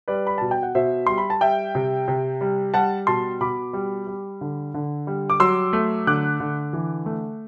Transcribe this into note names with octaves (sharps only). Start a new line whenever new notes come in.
G3 B4 D5
B5
B2 A5
G5
F#5
B2 C5 E5
G3 C6
B5
A5
G3 E5 G5
C3
C3
G3
G3 F#5 A5
B2 A5 C6
B2 B5 D6
G3
G3
D3
D3
G3
D6
F#3 C6 E6
A3
D3 D6 F#6
D3
E3
A3